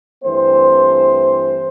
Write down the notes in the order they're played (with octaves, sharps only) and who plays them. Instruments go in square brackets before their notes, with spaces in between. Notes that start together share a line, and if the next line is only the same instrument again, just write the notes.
[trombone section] G2 E3 A3 C4 C5